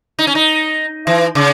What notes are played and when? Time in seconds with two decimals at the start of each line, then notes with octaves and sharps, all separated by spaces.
0.19 D#4
0.27 C#4
0.35 D#4
1.07 E3
1.35 C#3